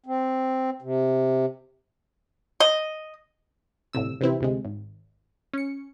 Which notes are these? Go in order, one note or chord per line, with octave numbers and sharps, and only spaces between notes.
C4
C3
D#5
G1 A2 C3 E6
C3 E3 C4 E4
D2 C3 G#3
G#1
C#4 C#7